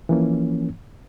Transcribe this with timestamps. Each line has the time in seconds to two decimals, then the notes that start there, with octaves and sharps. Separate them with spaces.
0.09 E3 F3 A#3 C#4